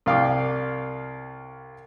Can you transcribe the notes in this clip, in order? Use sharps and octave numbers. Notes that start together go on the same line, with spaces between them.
C2 F5 G5 D6